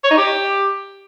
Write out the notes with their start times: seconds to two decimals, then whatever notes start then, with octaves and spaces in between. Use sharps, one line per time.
0.04 C#5
0.11 D#4
0.17 G4